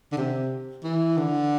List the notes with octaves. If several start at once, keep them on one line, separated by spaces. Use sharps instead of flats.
D3
C3
E3
D3